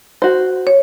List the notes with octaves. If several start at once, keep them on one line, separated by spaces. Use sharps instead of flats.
F#4 C5
C#5